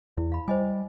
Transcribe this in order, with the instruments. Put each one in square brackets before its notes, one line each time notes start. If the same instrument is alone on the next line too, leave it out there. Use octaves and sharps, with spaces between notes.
[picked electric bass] E2 [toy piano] E4
[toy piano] F5 B5
[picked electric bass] G3 [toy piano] C5 D#5 G#5